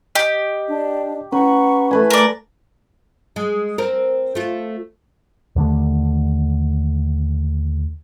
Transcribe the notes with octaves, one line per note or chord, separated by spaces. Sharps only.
G4 D#5
D4
C#4 B4 F#5 A#5 C#6
A3 B4 G#5
A#4 D5 A#5
G#3
C4 A#4
A3 F4
D#2 D3 A3